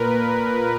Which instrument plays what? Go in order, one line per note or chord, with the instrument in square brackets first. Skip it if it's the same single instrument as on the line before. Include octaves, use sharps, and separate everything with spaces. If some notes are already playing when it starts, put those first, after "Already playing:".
Already playing: [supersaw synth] A#2 A#4 B4